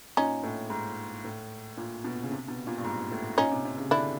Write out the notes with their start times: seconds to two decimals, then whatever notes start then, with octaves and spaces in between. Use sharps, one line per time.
0.17 A#2 C#4 D#4
0.43 A2
0.70 G#2
1.24 A2
1.77 A#2
2.04 B2
2.23 C#3
2.32 C3
2.48 B2
2.67 A#2
2.78 G2
2.84 G#2
3.11 A2
3.38 A#2 C#4 D#4
3.52 C3
3.65 C3
3.77 C#3
3.91 D3 D4 E4